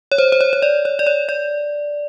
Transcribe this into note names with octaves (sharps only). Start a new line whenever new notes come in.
C#5
C5
C5
C#5
C#5
D5
C#5
D5
C#5
D5